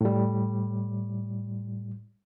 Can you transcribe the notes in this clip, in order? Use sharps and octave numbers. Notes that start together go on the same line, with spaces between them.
A2 G3